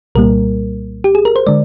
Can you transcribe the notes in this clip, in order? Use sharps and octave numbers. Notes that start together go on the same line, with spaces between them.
C2 A#2 G3 A#3 A#4
G4
G#4
A#4
C5
D3 G#3 D5